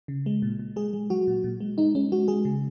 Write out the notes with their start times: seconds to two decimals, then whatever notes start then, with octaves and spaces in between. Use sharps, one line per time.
0.08 C#3
0.26 G#3
0.42 A#2
0.59 A#2
0.76 G#3 G#4
0.93 G#3
1.10 F#3 F#4
1.27 A#2
1.44 A#2
1.60 G#3
1.78 G#3 D#4
1.95 G#3 C#4
2.12 G#3 F#4
2.28 G#3 G#4
2.45 C#3